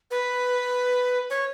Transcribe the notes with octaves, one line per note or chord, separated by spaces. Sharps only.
B4
C#5